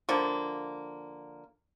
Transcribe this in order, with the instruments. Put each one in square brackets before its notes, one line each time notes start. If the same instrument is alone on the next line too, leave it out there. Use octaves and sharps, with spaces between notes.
[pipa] D3 F3 A#3